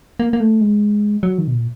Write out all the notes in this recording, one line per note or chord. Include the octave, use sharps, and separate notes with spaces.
A#3
A#3
A3
G#3
F#3
D#3
B2
A#2